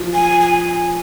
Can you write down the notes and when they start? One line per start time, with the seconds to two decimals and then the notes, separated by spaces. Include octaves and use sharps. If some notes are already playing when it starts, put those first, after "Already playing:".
Already playing: F3
0.14 G#5
0.40 G#5